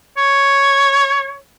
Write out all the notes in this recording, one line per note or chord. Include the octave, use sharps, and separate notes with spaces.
C#5